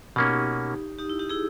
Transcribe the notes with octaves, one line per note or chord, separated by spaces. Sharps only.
B2 A#3 C#4 D#4 G4
D#4 G4
E4
D#4 G4
E4 G#4